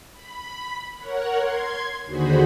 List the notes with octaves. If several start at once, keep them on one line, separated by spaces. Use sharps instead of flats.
B5
A#4 C#5 F#5
C6 G#6
D#2 D3 F#4 G#4 C5 B5